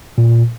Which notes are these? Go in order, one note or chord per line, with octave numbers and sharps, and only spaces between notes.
A#2